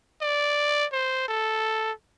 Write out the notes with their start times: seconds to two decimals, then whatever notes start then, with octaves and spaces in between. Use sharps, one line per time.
0.22 D5
0.93 C5
1.28 A4